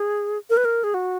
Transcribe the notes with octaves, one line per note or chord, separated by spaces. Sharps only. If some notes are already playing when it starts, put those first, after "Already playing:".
Already playing: G#4
A#4
B4
A#4
G#4
F#4